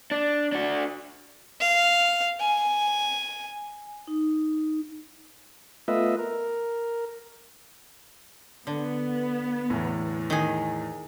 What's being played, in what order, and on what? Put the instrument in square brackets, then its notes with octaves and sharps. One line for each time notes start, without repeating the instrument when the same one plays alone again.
[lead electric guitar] D4
D4 F#4
[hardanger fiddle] F5
G#5
[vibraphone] D#4
[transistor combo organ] A3 B3 F4 B4 D#5 E5
A#4
[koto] D3 [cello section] B3
[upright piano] E2 A2
[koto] D#3 G#4